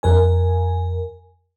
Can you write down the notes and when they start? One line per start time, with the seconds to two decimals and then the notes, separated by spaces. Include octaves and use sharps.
0.03 F2 A#4 G#5